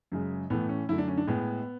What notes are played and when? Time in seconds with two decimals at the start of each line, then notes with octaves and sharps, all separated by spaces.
0.12 F#2 C#3 G#3
0.50 A2 E3 A3 B3
0.69 C#4
0.89 F#2 D3 A3 E4
0.98 D4
1.08 C#4
1.17 D4
1.27 A2 G#3 B3